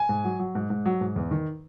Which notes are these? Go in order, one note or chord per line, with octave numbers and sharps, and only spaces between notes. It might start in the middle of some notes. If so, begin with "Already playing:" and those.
Already playing: G#5
G#2
F#3
F#3
G#2
G#2
F#3
G#2
E2
D#3